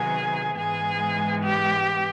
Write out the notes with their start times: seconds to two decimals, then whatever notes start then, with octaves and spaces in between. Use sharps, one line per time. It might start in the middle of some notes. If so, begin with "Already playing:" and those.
Already playing: C3 D#3 F#3 B3 G#4
0.57 G#2 E3 G#3 B3 G#4
1.43 G4